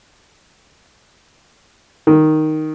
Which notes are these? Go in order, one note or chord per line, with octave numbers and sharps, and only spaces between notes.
D#3